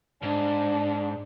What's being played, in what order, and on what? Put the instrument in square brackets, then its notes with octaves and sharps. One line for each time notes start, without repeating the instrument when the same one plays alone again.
[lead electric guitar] G#2 [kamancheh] D4